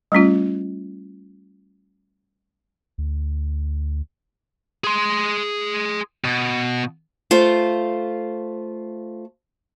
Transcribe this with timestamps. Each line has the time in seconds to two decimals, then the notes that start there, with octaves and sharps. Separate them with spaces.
0.12 G3 A3 C#4 F4
2.98 D2
4.84 G#4 C6
6.25 B2
7.31 A3 F4 C5